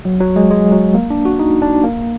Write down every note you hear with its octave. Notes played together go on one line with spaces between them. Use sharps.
F#3
F#3
G#3
G#3
F#3
A#3
D4
F#4
D#4
D4
A#3